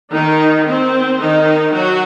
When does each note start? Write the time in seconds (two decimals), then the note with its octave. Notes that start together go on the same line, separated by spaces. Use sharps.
0.12 D#3 D#4
0.67 C4
1.20 D#3 D#4
1.74 F#3 F#4